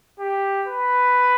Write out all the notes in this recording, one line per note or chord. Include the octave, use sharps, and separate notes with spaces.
G4
B4